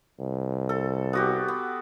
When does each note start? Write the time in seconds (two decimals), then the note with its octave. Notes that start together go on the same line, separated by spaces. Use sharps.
0.19 C2
0.69 A4
1.13 B3 F#4 G4
1.48 B3